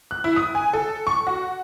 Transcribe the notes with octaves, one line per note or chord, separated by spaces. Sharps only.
F#6
E4
D#6
G#5
A4
C#6
F#4